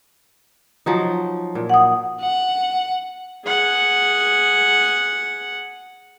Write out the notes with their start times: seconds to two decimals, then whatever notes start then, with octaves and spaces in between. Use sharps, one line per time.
0.86 F3 F#3 D#4
1.55 A#2
1.69 F#5 D#6
2.21 F#5
3.45 G#4 F#5